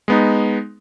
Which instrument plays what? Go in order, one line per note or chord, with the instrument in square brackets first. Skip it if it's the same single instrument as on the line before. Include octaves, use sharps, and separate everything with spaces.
[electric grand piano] G#3 B3 D#4